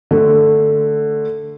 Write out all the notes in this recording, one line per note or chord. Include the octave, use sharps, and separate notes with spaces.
D3 A3